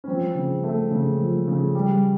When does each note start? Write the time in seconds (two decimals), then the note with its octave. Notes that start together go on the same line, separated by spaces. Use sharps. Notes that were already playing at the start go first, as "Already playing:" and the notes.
0.04 C#4
0.07 F3 C4
0.35 C#3
0.64 A3
0.91 C#3
1.19 F3
1.48 C#3
1.75 G3